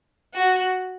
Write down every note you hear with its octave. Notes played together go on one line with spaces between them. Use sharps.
F#4